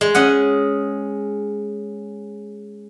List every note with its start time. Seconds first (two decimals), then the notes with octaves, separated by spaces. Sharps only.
0.01 G#3
0.15 C#4 D#5 F#5